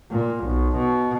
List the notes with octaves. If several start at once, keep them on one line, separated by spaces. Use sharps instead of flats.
A#2
B1
B2